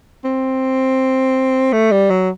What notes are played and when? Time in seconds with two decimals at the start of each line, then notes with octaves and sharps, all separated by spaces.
0.24 C4
1.73 A3
1.91 G3
2.10 F#3